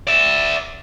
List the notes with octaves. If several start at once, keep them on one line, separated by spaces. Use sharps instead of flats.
D5 E5